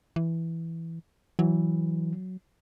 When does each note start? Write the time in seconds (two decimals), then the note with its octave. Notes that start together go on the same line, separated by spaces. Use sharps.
0.16 E3
1.39 E3 F#3